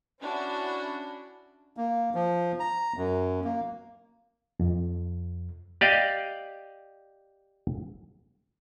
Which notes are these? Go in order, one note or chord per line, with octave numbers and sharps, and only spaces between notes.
C#4 D4 E4 F#4
A#3
F3
A#5
F#2
A#3
F2
G4 D5 D#5 F5